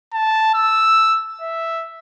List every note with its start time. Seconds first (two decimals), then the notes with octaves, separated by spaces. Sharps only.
0.14 A5
0.54 E6
1.41 E5